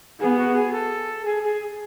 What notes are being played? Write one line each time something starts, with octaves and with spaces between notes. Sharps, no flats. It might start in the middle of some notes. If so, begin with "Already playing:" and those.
B3 G#4
F#4
G#4
A4
G#4
G#4